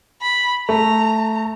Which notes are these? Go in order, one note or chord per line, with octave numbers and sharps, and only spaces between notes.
B5
A3 A#5